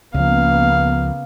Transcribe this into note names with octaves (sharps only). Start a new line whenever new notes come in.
C#2 C#3 F3 A#3 B3 F5